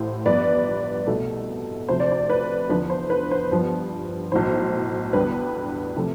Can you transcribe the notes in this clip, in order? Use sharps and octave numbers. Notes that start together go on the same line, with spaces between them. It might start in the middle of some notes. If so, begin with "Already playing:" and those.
Already playing: A1 A2 E3 C5
G1 G2 F3 B3 B4 D5
C2 B2 A3
D2 C3 F3 A3 C5
D5
C5
B4
E2 D3 F3 B4
C5
B4
C5
G2 F3 B3
B1 A2 E3 C5
E2 D3 G3 B3 B4
C3 F3 A3